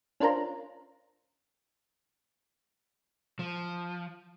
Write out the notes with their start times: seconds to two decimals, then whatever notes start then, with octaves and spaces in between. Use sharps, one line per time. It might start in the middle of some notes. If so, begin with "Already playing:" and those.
0.20 C#4 D4 F4 A#4 C5 A#5
3.39 F3